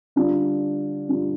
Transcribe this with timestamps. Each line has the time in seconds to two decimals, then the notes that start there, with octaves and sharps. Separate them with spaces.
0.16 D3 G3 D4 F4
1.09 D3 G3 D4 F4